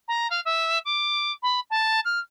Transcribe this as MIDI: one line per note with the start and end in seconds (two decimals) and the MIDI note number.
0.08 0.27 82
0.30 0.40 77
0.45 0.79 76
0.85 1.32 86
1.42 1.60 83
1.70 2.00 81
2.05 2.19 89